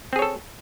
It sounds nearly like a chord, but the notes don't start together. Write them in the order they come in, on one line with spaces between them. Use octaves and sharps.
C4 G#4 C#5 A4